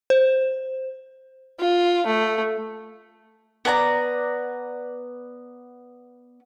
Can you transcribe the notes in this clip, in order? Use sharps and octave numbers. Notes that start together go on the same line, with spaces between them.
C5
F4
A3
B3 D5 A5 A#5